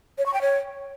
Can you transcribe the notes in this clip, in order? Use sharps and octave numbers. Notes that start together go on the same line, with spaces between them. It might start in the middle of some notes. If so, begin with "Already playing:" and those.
C#5
C#6
G5
C#5